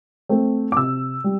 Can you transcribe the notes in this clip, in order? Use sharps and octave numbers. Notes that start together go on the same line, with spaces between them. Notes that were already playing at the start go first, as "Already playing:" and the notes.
A3 C4
D6
C3 E6
G3